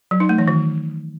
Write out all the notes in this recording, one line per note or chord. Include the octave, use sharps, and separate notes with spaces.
F#3
D#4
A3
E3
D#3